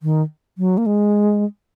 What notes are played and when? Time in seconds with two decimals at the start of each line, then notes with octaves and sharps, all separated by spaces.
0.03 D#3
0.58 F#3
0.78 A#3
0.86 G#3